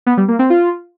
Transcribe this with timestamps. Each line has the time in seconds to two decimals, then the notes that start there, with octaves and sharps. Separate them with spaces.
0.06 B3
0.17 G3
0.28 A#3
0.39 C4
0.50 F4